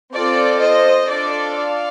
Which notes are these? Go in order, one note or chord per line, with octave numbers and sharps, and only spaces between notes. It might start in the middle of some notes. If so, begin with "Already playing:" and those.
C4 F4 A4 D5
C5 D#5
D4 F4 A4 D5
D5 F5